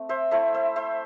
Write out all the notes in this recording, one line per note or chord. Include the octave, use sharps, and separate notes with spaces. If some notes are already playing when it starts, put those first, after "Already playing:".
Already playing: A3 C4
C5 E5
A3 E4 C5 E5
C5 E5
C5 E5